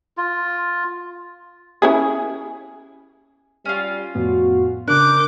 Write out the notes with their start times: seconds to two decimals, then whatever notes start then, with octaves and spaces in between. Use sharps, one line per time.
0.17 F4
1.82 C#4 E4 G#4
3.65 G3 C#4 F4
4.15 F2 A2 B3 F#4
4.88 C#3 D4 A#4 D6 F#6 G6